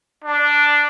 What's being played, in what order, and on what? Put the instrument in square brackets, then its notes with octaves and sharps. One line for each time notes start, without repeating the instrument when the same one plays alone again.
[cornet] D4